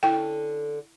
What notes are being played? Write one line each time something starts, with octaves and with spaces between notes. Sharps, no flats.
D3 C#4 E4 A4 G5